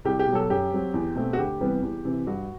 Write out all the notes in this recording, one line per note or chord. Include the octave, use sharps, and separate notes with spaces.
C2 G4
G4
B2
F#3 A4
F#2 G4
F#3 C4
E2
B2 A3 C4
F#4
D2 G4
C3 E3 G3 B3
E2
C3 E3
G2 F#4